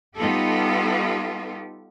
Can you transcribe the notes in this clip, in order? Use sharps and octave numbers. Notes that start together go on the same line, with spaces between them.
G3 B3 D#4 F4 G4 A4